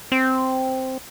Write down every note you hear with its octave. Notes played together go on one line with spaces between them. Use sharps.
C4